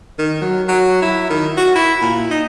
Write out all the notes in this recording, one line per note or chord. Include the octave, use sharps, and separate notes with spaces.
D#3
F#3
F#3
E4
D#3
F#4
E4
A#2
D#4